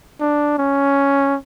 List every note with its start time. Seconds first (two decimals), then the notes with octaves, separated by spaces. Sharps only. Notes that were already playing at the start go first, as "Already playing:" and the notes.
0.20 D4
0.58 C#4